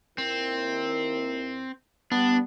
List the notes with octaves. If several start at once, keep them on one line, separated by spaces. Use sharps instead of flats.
D#2 C4 E4 A#4
G3 B3 D4